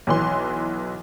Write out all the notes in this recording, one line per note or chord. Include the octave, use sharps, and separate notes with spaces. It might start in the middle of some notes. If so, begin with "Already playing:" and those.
B1 E3 C6